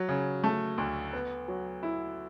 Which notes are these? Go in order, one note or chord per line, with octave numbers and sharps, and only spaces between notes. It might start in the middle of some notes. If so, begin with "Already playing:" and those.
Already playing: F#3
C#3
A3
D2
B3
F#3
E4